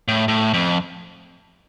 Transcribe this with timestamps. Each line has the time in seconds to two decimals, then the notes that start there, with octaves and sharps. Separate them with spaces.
0.08 A2
0.28 A2
0.54 F2